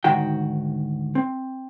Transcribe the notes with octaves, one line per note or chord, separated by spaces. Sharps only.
D2 G#2 D#3 F#4 G5
C4